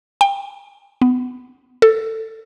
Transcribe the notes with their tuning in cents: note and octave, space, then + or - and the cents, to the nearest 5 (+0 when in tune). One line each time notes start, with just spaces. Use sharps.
G5 +25
B3 +20
A4 +15